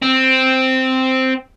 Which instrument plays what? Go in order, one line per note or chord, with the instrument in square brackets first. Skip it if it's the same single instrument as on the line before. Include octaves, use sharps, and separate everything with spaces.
[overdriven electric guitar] C4